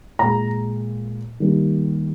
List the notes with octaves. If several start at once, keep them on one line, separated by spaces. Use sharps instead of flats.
A#2 G#3 A#5
D#3 G3 A#3